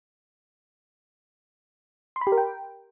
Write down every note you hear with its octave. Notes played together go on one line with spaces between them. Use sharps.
C6
B5
G4
A#4
G5